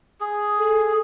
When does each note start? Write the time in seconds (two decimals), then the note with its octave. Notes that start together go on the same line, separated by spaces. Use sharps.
0.21 G#4
0.59 A4